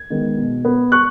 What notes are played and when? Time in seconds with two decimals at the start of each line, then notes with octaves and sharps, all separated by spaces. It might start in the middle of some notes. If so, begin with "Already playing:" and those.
Already playing: G#6
0.10 D#3 G#3 B3
0.37 B2
0.65 B3
0.92 C#6 F#6